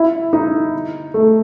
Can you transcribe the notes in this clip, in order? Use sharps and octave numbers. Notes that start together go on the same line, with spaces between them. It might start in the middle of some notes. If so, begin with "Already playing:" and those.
Already playing: E4
D#4
A3